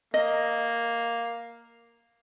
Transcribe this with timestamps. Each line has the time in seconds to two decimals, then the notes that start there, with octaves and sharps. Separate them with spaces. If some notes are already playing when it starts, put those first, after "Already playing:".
0.14 A#3 D#5